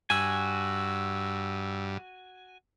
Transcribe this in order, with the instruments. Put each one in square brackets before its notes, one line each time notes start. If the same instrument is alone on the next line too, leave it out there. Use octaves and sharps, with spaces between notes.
[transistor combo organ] G2 [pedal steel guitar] F#4 G#5 [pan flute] E6